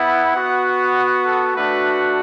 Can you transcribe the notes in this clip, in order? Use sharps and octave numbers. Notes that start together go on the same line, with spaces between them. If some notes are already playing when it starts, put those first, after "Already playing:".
Already playing: B3 E4 F#5
B3 F#4
A4
A3 D4 F#4 B4